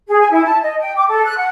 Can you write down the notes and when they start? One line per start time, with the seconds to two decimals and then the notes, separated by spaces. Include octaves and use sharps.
0.08 G#4
0.20 G#5
0.31 E4
0.44 A5
0.62 D#5
0.80 G5
0.96 D6
1.08 A4
1.25 F#6
1.37 F#5